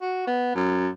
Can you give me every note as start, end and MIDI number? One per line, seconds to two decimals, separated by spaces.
0.02 0.23 66
0.27 0.55 59
0.55 0.88 42